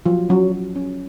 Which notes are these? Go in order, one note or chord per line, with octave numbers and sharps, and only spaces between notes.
F3 F#3 F4
F#3 C#4 F#4
F#3
C#4